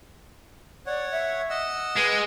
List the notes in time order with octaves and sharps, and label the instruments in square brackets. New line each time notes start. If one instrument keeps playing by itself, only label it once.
[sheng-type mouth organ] C#5 F#5 [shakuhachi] D5
[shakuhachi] E5
[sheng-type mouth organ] D#5 F#5 E6
[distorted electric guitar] G#3 [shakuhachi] B4